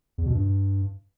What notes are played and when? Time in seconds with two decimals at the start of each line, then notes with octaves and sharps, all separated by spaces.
0.18 E2
0.26 B2
0.34 G2